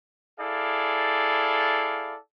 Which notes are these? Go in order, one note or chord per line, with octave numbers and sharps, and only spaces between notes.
E4 G#4 A4 D5 F5